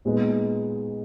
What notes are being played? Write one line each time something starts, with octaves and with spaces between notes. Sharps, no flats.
A#2 G#3 B3 D#4